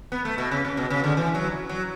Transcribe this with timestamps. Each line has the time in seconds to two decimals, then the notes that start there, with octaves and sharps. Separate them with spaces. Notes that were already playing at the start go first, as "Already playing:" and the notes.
0.12 B3
0.25 A3
0.38 B2
0.51 C#3
0.65 C#3
0.77 B2
0.90 C#3
1.04 D3
1.17 E3
1.34 F#3
1.69 F#3